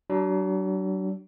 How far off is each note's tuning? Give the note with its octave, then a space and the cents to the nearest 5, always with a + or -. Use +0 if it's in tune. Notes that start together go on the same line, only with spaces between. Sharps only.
F#3 +40 D4 +0